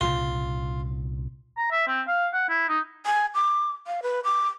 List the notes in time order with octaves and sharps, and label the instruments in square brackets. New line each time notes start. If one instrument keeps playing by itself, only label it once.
[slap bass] C2 A#2 C#3 [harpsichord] F4
[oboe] A#5
E5
C4
F5
F#5
E4
D#4
[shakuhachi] G#5
D6
F5
B4
D6